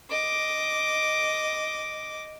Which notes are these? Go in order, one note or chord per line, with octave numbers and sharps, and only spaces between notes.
D#5 D6